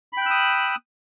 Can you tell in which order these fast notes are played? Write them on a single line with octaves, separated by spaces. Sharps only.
B5 G5 F#6 E6 D#6